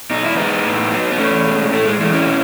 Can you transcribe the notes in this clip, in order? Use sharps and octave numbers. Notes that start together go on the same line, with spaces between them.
B2 D#4
E4
G#3 B3 D#4
A2
F#3
B3
E2 A3 C#4
B2 G#3
A2 A3
G#3
E3 G#3 A3
C#4 E4
B2